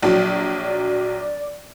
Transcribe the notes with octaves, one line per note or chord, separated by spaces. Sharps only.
A#1 F#3 D5